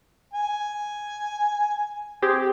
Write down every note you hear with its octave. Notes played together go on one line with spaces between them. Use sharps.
G#5
C4 G4 G#4